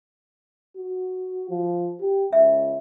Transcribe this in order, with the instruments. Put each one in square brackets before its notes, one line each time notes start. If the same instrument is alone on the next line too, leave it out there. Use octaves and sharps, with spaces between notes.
[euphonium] F#4
F3
G4
[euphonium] C#2 [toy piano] E5